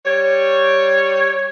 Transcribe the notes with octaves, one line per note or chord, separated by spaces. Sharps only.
G3 C#5